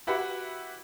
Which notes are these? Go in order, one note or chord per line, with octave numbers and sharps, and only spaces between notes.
E4 F#4 G4 B4 E5 F#5